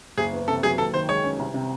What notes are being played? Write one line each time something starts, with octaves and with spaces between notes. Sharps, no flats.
F#1 G#4
E2
C3 A4
F#3 G#4
D#2 A4
D#3 C5
G#3 C#5
C#4
C2
C3